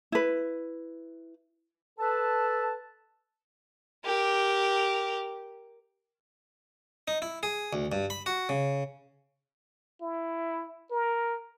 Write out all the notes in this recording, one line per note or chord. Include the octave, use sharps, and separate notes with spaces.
E4 B4
A4 B4 A5
G4 A#4
D#4
E4
G#4
D2
G2
B5
F#4
C#3
E4
A#4